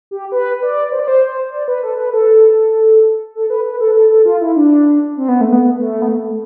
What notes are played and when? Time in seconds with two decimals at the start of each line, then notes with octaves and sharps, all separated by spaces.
0.11 G4
0.32 B4
0.63 D5
0.92 C5
0.99 D5
1.08 C5
1.52 D5
1.68 B4
1.83 A4
1.99 B4
2.14 A4
3.35 A4
3.50 B4
3.65 B4
3.80 A4
3.95 A4
4.11 A4
4.26 F4
4.41 E4
4.56 D4
5.17 C4
5.29 B3
5.41 A3
5.52 B3
5.78 A3
6.02 B3
6.08 A3